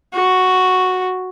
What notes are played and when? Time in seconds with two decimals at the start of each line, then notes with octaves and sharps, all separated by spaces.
0.14 F#4